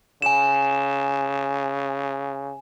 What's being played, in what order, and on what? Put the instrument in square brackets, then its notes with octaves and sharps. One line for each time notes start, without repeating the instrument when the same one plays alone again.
[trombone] C#3 [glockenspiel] G#5 E7